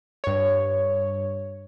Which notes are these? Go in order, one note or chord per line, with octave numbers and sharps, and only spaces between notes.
G2 C#5